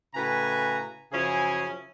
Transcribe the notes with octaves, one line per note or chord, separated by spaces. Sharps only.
A2 C#3 F#4 B4 G#5 A#5
F#2 C#3 F3 C#4 E4 G#4